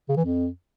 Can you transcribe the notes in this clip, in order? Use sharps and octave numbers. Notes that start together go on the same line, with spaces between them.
C#3
E3
F2